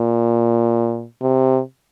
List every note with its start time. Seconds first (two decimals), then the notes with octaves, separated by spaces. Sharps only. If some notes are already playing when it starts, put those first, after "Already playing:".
Already playing: A#2
1.22 C3